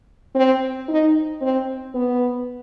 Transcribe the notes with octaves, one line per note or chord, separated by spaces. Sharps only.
C4
D#4
C4
B3